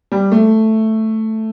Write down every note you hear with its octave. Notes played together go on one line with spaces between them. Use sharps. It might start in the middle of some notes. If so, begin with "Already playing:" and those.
G3
A3